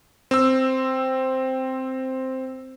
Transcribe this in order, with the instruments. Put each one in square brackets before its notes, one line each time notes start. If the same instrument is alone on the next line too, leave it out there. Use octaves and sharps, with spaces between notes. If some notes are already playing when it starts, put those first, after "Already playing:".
[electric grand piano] C4 E6